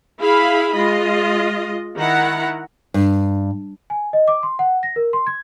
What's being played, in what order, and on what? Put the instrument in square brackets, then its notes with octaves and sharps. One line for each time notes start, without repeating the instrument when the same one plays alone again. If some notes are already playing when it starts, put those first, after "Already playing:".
[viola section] E4 G#4 F5 B5
G#3 F4 D#5
D#3 E4 F#5 A#5
[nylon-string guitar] G2
[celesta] G#5
D#5
D6
C6
F#5
A#6
A#4
C6
G#6